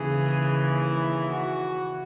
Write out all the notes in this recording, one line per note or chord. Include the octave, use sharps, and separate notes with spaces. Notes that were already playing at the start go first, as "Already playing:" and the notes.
Already playing: D#2 C#3 E3 G#4
E4
F#4